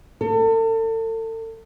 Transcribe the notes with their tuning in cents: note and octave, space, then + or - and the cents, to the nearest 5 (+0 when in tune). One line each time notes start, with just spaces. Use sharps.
A4 +35